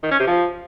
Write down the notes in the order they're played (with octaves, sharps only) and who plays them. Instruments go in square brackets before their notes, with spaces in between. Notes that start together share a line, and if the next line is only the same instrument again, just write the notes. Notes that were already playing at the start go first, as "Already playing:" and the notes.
[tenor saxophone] D#3
C#4
C3
F3